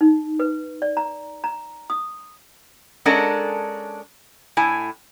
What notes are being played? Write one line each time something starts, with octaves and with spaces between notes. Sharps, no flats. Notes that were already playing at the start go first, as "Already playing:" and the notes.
D#4
B4
D5
A#5
A#5
D#6
G#3 C#4 D4 A4 A#4 F#5
A2 E4 G#5